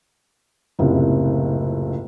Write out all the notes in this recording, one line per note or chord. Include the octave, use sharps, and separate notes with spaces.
F#1 C#2 A2 C3